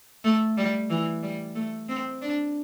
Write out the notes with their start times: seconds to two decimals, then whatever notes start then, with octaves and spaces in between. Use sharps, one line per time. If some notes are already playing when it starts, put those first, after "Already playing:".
0.24 A3
0.57 G3
0.90 E3
1.23 G3
1.55 A3
1.89 C4
2.21 D4